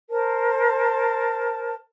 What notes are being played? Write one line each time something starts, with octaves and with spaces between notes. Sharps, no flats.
A#4 C5 A5